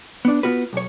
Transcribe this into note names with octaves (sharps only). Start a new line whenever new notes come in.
B3 D4
B3 F4 F#4 B4
B1 C#5